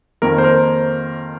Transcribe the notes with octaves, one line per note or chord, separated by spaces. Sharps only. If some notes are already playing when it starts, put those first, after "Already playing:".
F2 D#3 A#3 A#4
C5
A#4